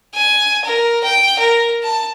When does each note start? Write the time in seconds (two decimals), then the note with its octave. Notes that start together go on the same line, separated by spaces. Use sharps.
0.14 G#5
0.64 A#4
1.04 G5
1.39 A#4
1.83 A5